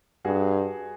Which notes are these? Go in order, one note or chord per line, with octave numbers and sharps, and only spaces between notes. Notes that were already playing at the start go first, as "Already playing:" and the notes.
G2 F#4 G#4